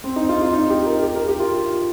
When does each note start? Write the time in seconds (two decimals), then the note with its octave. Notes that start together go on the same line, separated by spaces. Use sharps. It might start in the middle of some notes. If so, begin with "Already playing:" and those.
0.04 C4
0.16 D#4
0.29 F4
0.42 F4
0.53 D#4
0.70 G4
0.86 A#4
1.02 G4
1.16 A#4
1.28 G4
1.40 F4